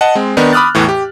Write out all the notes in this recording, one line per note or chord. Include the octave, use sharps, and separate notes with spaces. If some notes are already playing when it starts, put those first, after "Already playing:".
D#5 F#5 A5
G#3 C4
D#3 B3 D4 D#4
B5 D6 D#6 F6 F#6 A6
E2 A2 E3
G4